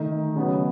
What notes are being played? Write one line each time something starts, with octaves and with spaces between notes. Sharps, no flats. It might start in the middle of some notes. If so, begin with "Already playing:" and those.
Already playing: D#3 A3 D#4
C#3 F#3 B3